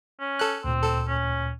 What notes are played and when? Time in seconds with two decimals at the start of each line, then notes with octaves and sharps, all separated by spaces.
0.20 C#4
0.39 A4 F#6
0.64 D2 A#2 C4
0.84 A4
1.08 C#4